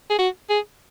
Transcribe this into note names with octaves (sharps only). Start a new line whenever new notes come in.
G#4
F#4
G#4